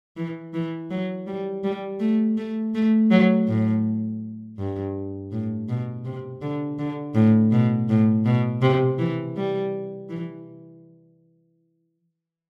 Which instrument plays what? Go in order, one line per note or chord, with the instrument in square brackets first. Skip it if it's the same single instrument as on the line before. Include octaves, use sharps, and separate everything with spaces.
[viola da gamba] E3
E3
F#3
G3
G3
A3
A3
A3
F#3
A2
G2
A2
B2
C3
D3
D3
A2
B2
A2
B2
C3
E3
G3
E3